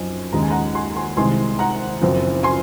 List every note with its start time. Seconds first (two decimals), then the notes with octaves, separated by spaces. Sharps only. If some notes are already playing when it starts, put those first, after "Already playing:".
Already playing: F#2 F3 C4 D#4 G#5
0.33 D#2 C#3 G#3 D#4 A#5
0.43 G#5
0.50 F#5 A#5
0.75 G#5 C6
0.97 G#5 C6
1.17 C2 C3 D#3 G#3 G#5 C6
1.59 F#5 A#5
2.02 F#1 F#2 F3 C4
2.43 G#5 C6